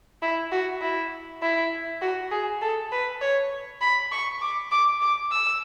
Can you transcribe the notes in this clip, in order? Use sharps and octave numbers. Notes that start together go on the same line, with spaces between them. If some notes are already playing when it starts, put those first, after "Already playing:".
E4
F#4
E4
E4
F#4
G#4
A4
B4
C#5
B5
C#6
D6
D6
D6
E6